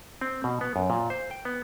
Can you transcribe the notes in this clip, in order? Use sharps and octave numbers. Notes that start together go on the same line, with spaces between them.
C4
B2
B3
F#2
A#2
C5
G5
B3